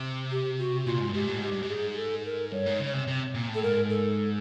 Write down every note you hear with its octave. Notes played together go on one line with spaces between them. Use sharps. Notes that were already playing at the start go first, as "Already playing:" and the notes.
Already playing: C3
G4
F#4
A#2 F4
G#2
G2
G#2 G4
A2
G#2 G4
G2
G#2 G4
G#4
A4
A#4
G2 C#5
G#2
C#3
C3
C3
A#2
A2
A4
G#2 A#4
A4